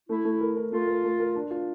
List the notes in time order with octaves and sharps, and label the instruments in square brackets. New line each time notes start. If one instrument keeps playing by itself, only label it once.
[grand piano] A3 [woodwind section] E4
[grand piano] A3
A#4
A#4
[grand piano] A3 [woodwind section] F4
[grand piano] A#4
A3
A#4
D4
F4